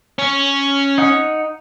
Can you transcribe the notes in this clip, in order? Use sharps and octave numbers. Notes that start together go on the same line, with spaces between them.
C#4
D#4 F#5